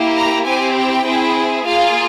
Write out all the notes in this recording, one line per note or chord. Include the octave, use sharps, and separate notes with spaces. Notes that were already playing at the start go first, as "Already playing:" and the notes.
Already playing: A#3 E4 G4
A#5
C4 E4 G4 G#5
G5
C4 E4 G#4
A#3 F4 G#4 F5